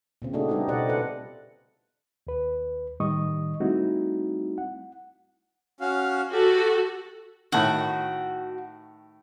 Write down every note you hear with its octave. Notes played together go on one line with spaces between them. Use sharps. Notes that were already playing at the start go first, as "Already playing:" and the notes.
A#2 C#3 C4
A3 C4 D4 D#4 F#4 G#4
G3 B3 D#4 E4 G4 A4
B2 G4 C5 D5 D#5 F#5
F4 A4 B4 F#5
D#2 B4
A2 D#3 G3 D#5 C#6 D#6
G3 A3 C4 D#4 E4 F#4
F#5
C#4 F#4 F5
F#4 G4 A4
A2 D#3 F#4